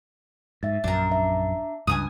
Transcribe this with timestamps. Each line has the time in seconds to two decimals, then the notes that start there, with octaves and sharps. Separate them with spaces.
0.63 G#2 E5 A6
0.84 A#1 F#2 D4 A#5
1.12 E5
1.87 C#2 G2 G#5 A#5 D#6